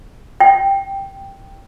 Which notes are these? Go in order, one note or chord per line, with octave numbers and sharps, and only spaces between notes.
G5